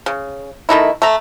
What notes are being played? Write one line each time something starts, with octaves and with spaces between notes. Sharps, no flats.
C#3
D#3 A3 D#4 E4
A3 A#5